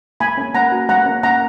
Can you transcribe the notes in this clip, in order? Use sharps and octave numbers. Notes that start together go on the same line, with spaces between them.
A#3 G#5 B5
C#4
A#3 F#5 A#5
F#4
A#3 F#5 A#5
C#4
A#3 F#5 A#5